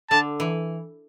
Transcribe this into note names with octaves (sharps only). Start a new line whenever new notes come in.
D3 A5
E3